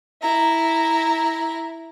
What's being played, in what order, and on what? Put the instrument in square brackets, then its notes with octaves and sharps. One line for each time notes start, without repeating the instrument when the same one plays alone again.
[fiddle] E4 A#5